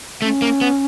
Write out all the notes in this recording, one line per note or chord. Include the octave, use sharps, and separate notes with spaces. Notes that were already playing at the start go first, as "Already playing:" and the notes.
A3 C#4
A#3
B3